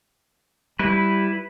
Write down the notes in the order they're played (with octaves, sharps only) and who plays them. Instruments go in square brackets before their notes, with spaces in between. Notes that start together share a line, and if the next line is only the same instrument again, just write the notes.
[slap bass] G3 [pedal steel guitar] E4 B4